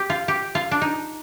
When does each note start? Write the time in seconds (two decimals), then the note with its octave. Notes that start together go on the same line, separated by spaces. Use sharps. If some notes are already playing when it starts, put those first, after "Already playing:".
Already playing: G4
0.10 F4
0.28 G4
0.55 F4
0.71 D4
0.82 D#4